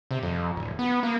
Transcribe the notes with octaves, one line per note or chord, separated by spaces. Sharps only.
C3
F2
D1
B3
A#3